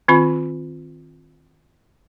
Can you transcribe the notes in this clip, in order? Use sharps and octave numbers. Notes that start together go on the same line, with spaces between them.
D#3 C4 F4 B5